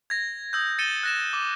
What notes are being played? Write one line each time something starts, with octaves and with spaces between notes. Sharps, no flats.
G#6 A#6
D#6 E6 G6
A6 C#7 D#7 E7 G7
F#6 A#6 E7
D6